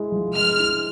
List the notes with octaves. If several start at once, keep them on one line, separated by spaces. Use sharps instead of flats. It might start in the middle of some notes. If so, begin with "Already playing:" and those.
Already playing: G#3 E4
F3
G#3 F6
E4